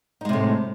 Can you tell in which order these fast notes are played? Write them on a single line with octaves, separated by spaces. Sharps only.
D#4 G#3 C3 A2